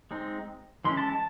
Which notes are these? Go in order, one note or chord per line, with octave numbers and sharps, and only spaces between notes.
G#3 C4 D#4
E3 G#3 C#4 E4 C6
A5
A5